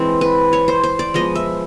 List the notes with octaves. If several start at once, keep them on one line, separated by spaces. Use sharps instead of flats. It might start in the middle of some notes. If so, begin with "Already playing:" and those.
Already playing: E3 G#3 C4
B4
C#5
C5
C5
D5
F3 G#3 B3 D#5
E5